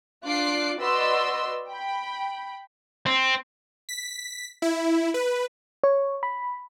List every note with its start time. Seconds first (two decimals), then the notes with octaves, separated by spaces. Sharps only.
0.23 D4 F4 D6 F#6 C7
0.79 F#4 B4 D5 D#5 C6 E6
1.69 G5 B5
3.06 C4
3.89 B6
4.62 E4
5.14 B4
5.84 C#5
6.23 B5